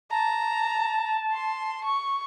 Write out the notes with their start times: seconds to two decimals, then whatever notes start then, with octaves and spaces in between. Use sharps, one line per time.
0.11 A5 A#5
1.33 C6
1.84 C#6